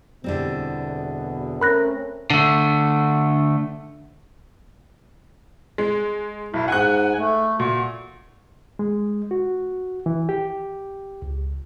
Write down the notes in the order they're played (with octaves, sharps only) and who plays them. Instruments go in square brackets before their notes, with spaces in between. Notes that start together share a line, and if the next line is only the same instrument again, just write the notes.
[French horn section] E2 B2 [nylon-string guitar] D3 G3 C4
[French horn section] A3 C4 C#4 [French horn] A#4 [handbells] B5 F#6 A#6
[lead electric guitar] D3 A3
[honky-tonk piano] G#3
[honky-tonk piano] B1 [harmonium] E4
[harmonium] G#2 G#5 [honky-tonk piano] F#5 F#6
[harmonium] A3
[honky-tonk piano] A#2 [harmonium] F#4
[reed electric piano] G#3
F#4
E3
G4
C#2